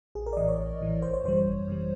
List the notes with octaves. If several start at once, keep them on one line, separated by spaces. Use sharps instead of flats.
A#1 G#4
A#4
D5
A2 E3 D#5
C#5
A#1
A2 E3
G#1 C5
C#5
F#2 C#3 E3 G3 C5
G#1
F#2 C#3 E3 G3